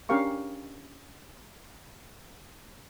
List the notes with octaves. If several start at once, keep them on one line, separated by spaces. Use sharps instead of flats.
C#4 D4 G4 A#4 F5 C#6